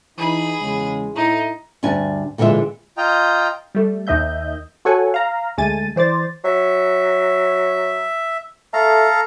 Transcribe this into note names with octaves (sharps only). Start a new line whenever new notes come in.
E3 D#4 G#4 B5
E2 C#3 G#3
A2 D#4 E4
D2 G2 D4 G#5
A#2 D3 E3 G#3 E5
F4 D#5 G5 A#5
G3 A3
D#2 D#3 D#5 E5 G6
F#4 A4 C#5 F#5 G#5
F5 A#5
D2 G#3 A3 G#5 A6 D#7
E3 C5 D5 A6
F#3 E5
A3 A4 F5 A#5